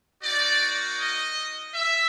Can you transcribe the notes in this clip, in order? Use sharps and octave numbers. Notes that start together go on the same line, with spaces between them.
A#3 D#4 F#4 D5
D#5
E5